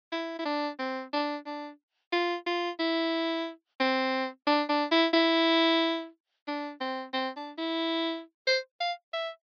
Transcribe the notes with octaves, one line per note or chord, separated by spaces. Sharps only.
E4
E4
D4
C4
D4
D4
F4
F4
E4
C4
D4
D4
E4
E4
D4
C4
C4
D4
E4
C5
F5
E5